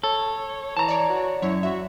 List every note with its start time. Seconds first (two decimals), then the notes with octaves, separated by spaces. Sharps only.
0.04 A4 C#5
0.77 E3 A5 A#5
0.88 C#5 D5
1.09 F#4
1.42 F#2 E4 C#5
1.63 F#4 E5